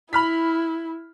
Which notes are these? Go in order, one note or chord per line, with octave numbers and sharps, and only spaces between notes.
E4 B5 F6 B6